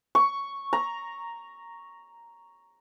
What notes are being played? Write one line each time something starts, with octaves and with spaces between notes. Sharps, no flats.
C#6
A#5